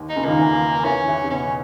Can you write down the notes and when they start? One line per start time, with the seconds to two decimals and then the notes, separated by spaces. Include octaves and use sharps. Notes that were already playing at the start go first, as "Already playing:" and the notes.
Already playing: D#2 D#3
0.09 D#4
0.16 C#2 C#3
0.25 D#2 D#3 A#3
0.39 E2 E3
0.85 E2 E3 C#4
1.08 E2 E3
1.24 C#3
1.30 B2 C#4